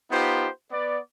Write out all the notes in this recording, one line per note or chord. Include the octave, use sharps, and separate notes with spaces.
B3 D#4 F4 G4 C5
B3 D5